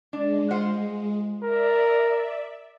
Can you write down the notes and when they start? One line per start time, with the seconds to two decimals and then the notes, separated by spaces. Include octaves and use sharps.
0.13 G#3 D4
0.51 F4 C5 F#5
1.43 A#4 D5 E5